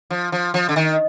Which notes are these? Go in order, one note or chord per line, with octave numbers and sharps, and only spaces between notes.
F3
F3
F3
D3
D#3